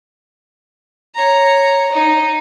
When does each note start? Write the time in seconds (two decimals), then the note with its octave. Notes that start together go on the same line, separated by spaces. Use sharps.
1.15 C#5 A#5
1.92 D#4